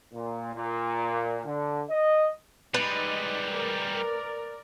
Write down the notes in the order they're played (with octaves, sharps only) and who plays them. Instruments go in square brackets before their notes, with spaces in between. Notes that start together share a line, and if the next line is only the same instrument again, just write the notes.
[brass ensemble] A#2
A#2
D3
D#5
[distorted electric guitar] G3 G#3 [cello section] D#4 D5 [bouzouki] B4
[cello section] A#4 D5